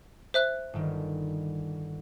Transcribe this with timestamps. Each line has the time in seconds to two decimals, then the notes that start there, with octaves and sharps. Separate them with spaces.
0.34 C5 E5 F#6
0.73 G1 D#3